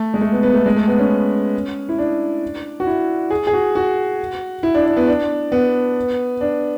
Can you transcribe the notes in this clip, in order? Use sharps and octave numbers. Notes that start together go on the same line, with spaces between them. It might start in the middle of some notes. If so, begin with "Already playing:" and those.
Already playing: A3
G#3
A3
B3
B3
A3
G#3
A3
B3
C#4
E4
D4
F#4
E4
G#4
G#4
F#4
F#4
E4
D4
D4
B3
D4
B3
D4